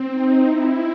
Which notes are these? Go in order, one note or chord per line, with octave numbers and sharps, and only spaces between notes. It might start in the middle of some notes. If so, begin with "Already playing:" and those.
Already playing: C4
D#4
E4